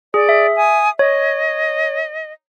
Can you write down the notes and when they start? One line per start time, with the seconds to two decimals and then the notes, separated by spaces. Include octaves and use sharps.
0.14 G#4 D5
0.29 E5
0.56 G#5 D#6
0.99 C#5 D#5